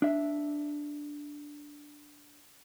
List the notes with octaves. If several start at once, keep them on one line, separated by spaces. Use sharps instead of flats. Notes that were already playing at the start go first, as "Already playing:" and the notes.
D4 E5